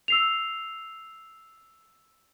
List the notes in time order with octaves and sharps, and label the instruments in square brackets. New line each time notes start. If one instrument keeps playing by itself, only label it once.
[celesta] E6 C7 F7